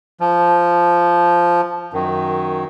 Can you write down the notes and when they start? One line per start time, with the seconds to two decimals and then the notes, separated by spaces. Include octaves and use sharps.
0.20 F3
1.93 F#2 D#3